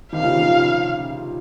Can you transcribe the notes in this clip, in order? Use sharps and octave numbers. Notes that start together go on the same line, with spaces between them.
C3 D#3 F5
A#2 C#3
C3 D#3
C#3 F3